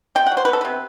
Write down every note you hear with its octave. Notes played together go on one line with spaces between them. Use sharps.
C3 G5
F#5
F#3
C5
B4
B3
A4
C3 B4